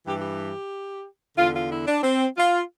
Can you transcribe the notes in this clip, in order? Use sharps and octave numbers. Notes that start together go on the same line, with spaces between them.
G2 E3 G4
G4
E2 D3 F4
F4
E4
D4
C4
F4